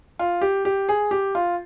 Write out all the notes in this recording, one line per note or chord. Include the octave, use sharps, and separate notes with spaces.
F4
G4
G4
G#4
G4
F4